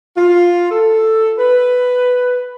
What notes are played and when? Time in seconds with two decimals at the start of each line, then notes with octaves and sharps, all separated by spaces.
0.17 F4
0.71 A4
1.38 B4